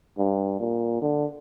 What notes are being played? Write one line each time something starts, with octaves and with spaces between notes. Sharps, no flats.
G2
A#2
D3